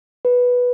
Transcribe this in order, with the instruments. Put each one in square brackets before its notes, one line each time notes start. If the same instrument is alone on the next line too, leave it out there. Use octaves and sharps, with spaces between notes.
[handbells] B4